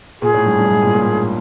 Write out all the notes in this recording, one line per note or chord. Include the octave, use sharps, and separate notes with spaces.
A#2 G#4
A2
G2
G2
A2
G#2
A#2
A2
A#2
A2